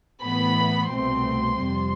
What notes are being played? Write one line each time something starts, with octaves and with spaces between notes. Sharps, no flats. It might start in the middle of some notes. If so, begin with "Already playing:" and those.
A2 E3 B3 B5
C2 B2 A3 C4 C6
F2 C3 G3